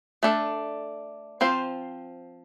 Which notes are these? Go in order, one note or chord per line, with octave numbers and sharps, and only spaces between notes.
A3 D4 A4
F3 C4 F4 C5